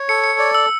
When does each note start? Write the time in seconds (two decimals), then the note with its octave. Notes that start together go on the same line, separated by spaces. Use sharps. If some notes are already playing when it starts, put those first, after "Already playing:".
Already playing: C#5
0.09 A4 C#7
0.24 C#7
0.39 D5
0.55 E6